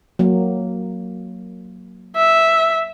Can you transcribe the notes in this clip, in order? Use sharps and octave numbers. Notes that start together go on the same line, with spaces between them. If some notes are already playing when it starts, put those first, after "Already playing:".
F#3 A#3
E5